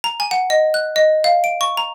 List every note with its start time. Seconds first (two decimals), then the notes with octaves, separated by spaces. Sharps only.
0.04 A#5
0.20 G#5
0.31 F#5
0.50 D#5
0.74 F#6
0.96 D#5
1.24 F5
1.44 D7
1.61 C#6
1.77 A#5